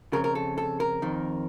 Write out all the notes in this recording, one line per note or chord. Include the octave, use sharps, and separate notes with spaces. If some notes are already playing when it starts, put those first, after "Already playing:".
F2 C#3 A#4
A#4
A4
A4
A#4
F2 D#3